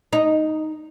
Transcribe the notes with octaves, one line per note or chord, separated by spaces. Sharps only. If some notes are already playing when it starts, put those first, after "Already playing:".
D#4